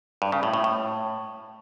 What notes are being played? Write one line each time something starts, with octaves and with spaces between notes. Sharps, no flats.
G2
C#3
A2
A2
A2